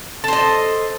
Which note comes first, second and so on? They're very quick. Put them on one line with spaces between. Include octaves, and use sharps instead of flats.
A4 C5 D#5